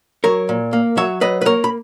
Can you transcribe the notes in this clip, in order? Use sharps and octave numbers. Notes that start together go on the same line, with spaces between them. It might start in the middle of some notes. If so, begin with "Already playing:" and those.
F#3 A#4 C#5
A#2
A#3
F#3 C#5 E5
F#3 B4 D#5
B4
A#3 A#4 C#5
B5